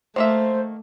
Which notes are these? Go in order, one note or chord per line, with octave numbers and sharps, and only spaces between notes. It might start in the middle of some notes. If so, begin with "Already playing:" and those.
D#3 A3 A#3 C5 E5